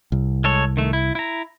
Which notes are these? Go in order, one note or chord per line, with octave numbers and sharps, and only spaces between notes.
C2
G#3 A4 C#5
D#3 A3
E4
E4 A#5